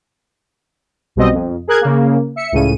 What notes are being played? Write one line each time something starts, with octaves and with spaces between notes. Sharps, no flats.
B1 B2 G3 C4 D#5
F2
G#4 A#4 F#6 G#6
C#3 A#3
E5 C#7
C#2 A2 C#3 D#7